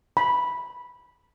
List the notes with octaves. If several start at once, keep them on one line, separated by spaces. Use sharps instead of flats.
B5